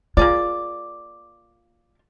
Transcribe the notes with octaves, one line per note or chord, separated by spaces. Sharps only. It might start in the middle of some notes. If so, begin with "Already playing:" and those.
A#3 F4 G#4 D5